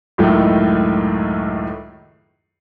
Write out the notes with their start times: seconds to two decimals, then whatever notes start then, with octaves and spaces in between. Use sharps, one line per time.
0.18 C#2 F#2 A2 D#3 A3